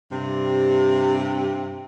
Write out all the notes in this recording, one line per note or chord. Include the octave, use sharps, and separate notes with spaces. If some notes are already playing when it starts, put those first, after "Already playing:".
G2 C3